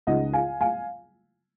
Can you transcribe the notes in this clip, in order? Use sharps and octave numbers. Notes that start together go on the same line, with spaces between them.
C#2 C#3 G#3 D#4 D#5 F#5
F5 G#5
F5 G#5